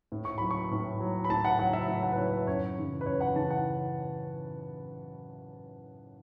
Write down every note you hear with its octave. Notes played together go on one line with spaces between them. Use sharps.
A2
C#6
F#3 B5
C#6
A2
F#3
B5
A2 A5
F#5
F#3 F#5
E5
A2 E5
F#5
B4
F#3 C#5
E5
F#2 C#5
C#3 E3
B4
F#2 C#5
F#5
C#3 E3 A5
F#5